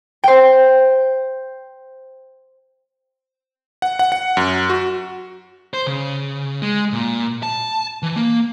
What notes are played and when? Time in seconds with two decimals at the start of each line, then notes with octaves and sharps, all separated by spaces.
0.24 C5 G5
3.82 F#5
3.99 F#5
4.12 F#5
4.37 F#2
4.70 F#4
5.74 C5
5.87 C#3
6.62 G#3
6.93 A#2
7.43 A5
8.03 E3
8.16 A#3